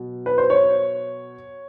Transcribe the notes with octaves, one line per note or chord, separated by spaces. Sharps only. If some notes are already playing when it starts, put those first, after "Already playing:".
Already playing: B2 F#3
B4
C5
C#5